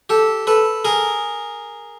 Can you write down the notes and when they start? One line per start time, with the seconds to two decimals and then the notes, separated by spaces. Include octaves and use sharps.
0.10 G4 A4
0.47 A4 B4
0.85 G#4 A#4